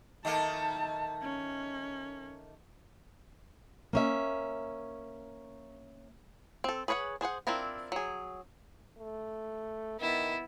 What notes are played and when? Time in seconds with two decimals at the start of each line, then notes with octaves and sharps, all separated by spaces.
0.25 D#3 A3 A#3 A5
1.22 C#4
3.93 A#3 C#4 E5
6.64 C4 A4
6.88 G#4 B4 C#5 F5 F#5
7.21 D4 G#4 C5 F#5
7.47 C4 D4 E4 F4 A#4
7.92 F#3 G#4
8.99 A3
10.00 D#3 B3 E4